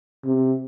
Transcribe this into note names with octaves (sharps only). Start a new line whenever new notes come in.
C3